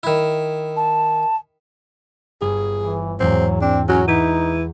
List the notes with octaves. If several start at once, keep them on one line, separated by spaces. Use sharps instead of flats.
D#3 E4
A5
G1 G#4
E3
E2 G#2 F#3 C4
C4 D4
F#3 C#4 F#4 A#5
E3 D#4 G6 B6 C#7